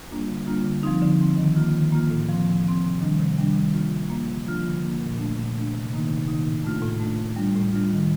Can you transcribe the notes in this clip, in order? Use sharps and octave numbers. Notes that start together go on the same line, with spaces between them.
G3 A#3 D4 F4
D3
G3 A#3 D4 F4
D3
F3 C4 D#4
D3
F3 C4 D#4
D#3
A#3 F4
D#3
A#3 F4
A2
F3 C4
A2
F3 C4
C3
D#3 G3 D4
C3
D#3 G3 D4
D#3
A#3 D4 F4
D#3
A#3 D4 F4
D3
F3 A#3 D4 F4
D3
F3 A#3 D4 F4
A#2
A3 D4
A#2
A3 D4
C3
D#3 A#3 D#4
C3
D#3 A#3 D#4
A2
A3 D4 F4
A2
A3 D4 F4
A2
G3 D4 F4
A2
G3 D4 F4
D#3